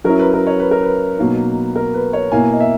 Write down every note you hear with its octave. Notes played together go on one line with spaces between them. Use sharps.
F#3 C#4 E4 A#4
B4
A#4
C#5
B4
A#4
B4
B2 F#3 A#3 D#4
A#4
B4
C#5
B2 A#3 E4 G#5
D#5
E5